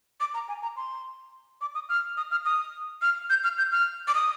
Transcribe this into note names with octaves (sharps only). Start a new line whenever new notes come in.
D6
A#5
G#5
A#5
C6
D6
D#6
F6
D#6
F6
D#6
F6
G6
F6
G6
F6
D6
D#6